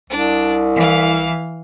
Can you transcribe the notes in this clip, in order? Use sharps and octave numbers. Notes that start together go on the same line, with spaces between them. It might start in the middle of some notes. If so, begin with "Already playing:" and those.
C2 D4
E3 F5